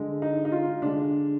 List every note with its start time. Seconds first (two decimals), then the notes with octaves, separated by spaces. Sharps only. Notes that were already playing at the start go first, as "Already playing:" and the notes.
Already playing: D3 G#3
0.22 D#4
0.45 D#4
0.52 F4
0.82 D3 G#3 D4